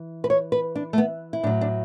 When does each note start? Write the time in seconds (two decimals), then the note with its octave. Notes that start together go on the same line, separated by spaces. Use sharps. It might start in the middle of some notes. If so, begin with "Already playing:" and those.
Already playing: E3
0.24 B4
0.30 C#5
0.52 B4
0.75 D4
0.93 A3
0.98 B3
1.33 E4
1.43 A2 D4
1.47 F#3
1.61 D4